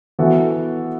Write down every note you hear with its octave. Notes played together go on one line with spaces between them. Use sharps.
E3 B3 F#4 A4